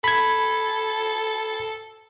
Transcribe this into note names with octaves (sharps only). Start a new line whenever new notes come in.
A4 B5 G#6